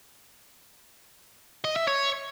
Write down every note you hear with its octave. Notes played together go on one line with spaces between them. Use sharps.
D#5
E5
C#5